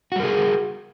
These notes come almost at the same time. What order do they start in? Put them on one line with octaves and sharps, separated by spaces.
F#4 G3 A#4 G#4